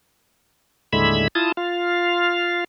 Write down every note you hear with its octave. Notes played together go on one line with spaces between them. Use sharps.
D#2 A2 D3 G#3 E5 B5
E4 F4 A5 D#6
F4 F5